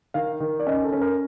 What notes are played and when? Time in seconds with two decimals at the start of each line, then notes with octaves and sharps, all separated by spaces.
0.14 D#3 F5
0.40 D#3
0.60 D5
0.67 C#4 D#5
0.84 A4
0.92 C#4
1.01 A#4